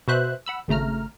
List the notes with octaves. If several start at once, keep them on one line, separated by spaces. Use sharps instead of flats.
B2 F#4 B4 C5 E5 F#6
F#5 B5 E6
G#1 C#3 A3 A#5 F6